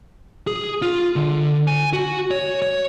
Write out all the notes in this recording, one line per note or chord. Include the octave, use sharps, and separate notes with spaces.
G#4
F4
D3
G#5
F#4
C#5
C#5